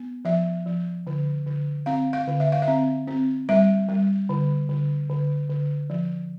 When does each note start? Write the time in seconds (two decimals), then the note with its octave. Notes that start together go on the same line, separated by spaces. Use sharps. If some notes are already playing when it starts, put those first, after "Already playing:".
Already playing: B3
0.25 F3 E5
0.66 F3
1.07 D3
1.46 D3
1.86 C4 F5
2.13 F5
2.27 D3
2.40 E5
2.52 F5
2.62 E5
2.68 C4
3.07 C4
3.49 G3 E5
3.89 G3
4.29 D3
4.69 D3
5.10 D3
5.50 D3
5.90 F3